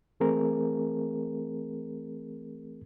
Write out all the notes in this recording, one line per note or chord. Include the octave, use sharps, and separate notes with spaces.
E3 A3 C4 G#4 A#4